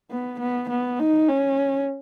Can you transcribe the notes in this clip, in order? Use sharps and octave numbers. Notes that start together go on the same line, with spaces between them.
B3
B3
B3
D#4
C#4